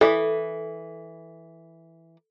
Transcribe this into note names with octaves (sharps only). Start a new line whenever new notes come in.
E3 A4 B5